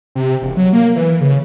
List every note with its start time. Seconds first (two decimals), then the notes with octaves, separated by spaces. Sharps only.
0.15 C3
0.42 E1
0.57 F#3
0.73 A#3
0.96 E3
1.21 C#3